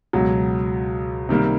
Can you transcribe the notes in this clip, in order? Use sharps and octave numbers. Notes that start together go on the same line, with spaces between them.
C#2 B2 F#3
C3 D#3 G3 A#3